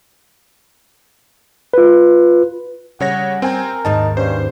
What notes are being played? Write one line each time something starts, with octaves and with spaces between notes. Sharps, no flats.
F4 B4
C#3 G3 C#5 F#5 A#6
C4 A#4 G5 G#5
D#2 G#2 D#3 D#4 A5
G2 C#4 C5